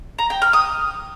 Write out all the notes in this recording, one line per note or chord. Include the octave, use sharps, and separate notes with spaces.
A#5
G5
F6
D#6